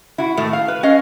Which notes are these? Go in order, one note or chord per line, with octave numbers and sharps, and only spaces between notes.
E4 F#4
A2 D#3 A3
F5
B4
C#4 D#5 F5